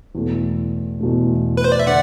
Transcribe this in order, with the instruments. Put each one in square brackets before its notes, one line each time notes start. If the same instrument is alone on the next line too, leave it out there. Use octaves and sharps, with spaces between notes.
[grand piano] E2 B2 A3
E2 B2 A3
[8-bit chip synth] B4
C5
D5
E5
[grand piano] D3 [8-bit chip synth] D5 F#5